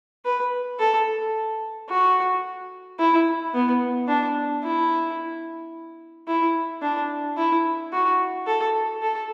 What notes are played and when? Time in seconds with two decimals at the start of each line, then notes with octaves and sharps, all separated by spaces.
0.25 B4
0.79 A4
1.89 F#4
2.99 E4
3.54 B3
4.08 D4
4.63 E4
6.28 E4
6.82 D4
7.37 E4
7.92 F#4
8.47 A4
9.02 A4